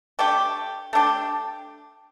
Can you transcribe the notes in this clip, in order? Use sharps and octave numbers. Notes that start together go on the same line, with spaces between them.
A3 D4 G4
A3 D4 G4